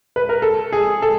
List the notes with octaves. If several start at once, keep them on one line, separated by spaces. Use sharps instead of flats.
B4
A#4
A4
G#4
A4